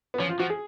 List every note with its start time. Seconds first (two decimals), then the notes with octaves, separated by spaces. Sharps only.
0.14 B3
0.19 F3 C#4
0.29 F4
0.39 F3 F#4
0.50 G#4